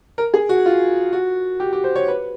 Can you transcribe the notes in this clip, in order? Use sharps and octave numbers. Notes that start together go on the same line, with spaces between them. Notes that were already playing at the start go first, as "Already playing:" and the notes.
A#4
G#4
F#4
F4
F#4
G4
G4
C5
C#5
B4